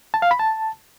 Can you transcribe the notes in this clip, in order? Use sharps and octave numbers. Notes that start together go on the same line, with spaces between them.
A5
F5
B5
A5